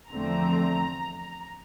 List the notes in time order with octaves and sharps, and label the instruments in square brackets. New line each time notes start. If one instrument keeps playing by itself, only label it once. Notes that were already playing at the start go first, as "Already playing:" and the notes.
[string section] E2 D3 F3 A3 C4 A#5